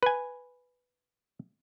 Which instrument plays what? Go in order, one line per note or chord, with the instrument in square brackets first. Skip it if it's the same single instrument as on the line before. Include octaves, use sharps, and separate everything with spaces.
[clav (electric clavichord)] B4 G#5